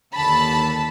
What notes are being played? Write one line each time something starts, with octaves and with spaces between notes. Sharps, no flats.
D#2 D3 A5 B5